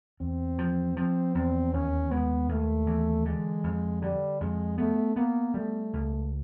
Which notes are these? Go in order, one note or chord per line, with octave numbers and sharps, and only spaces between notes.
E2 C4
F3
F3 C4
E2 C4
D#2 C#4
G#3 B3
D#2 A3
E3
D3 G#3
F2
D3 G3
F2 G#3
A3 B3
A#3 B3
G3 A3
C#2